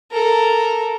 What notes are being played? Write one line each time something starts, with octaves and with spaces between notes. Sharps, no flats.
A4 A#4